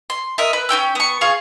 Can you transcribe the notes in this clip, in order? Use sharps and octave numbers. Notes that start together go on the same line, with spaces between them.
C6
A#4 D#5 E5
B4
C#4 F#4 G5 E6
B3 C#6
F4 G#4 F5 C#6